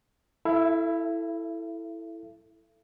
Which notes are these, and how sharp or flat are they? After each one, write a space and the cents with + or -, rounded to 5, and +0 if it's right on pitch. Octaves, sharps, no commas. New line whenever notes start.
E4 +0 A4 +0 E5 +45